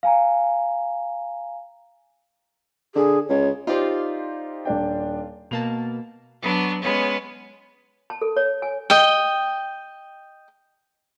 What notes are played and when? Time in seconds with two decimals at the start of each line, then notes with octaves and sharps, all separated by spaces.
0.03 F5 G#5 A#5
2.95 D3 G#4
3.29 C#2 C#5
3.67 D#4 F4 G4 C5 D5
4.65 D#1 D4 G5
5.51 B2 A#3 A5 F7
6.41 F#3 B3 D4
6.81 G#3 B3 C#4
8.10 A5
8.21 A4
8.36 C#5
8.62 G#5
8.90 D#5 G5